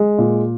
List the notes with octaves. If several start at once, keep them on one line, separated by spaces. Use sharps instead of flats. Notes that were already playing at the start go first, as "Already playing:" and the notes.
Already playing: G#3
A#2